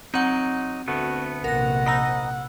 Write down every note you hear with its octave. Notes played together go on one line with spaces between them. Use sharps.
F#3 C4 D#4 F#5
D2 A3 B3 F#4
A#1 C3 A#4 F#5 A#6
D#5 A#5 B5 E6